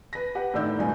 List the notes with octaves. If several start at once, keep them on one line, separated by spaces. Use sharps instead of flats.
B4 A#6
G4 B4 F#5
A2 D#3 D4 E6 G6
G2 B2 G#5